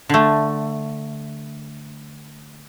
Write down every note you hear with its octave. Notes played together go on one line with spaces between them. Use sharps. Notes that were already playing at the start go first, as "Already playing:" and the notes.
D3 A3